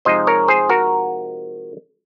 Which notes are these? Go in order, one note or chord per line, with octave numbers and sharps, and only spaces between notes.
C3 F3 G#3 D#4 C5 D#5
A#4 C#5
G#4 C5
F#4 A#4